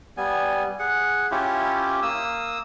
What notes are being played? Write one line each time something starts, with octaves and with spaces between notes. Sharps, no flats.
G3 B3 G#5
G#4 F#5
C#4 E4 F4 G4
A#3 D#6 E6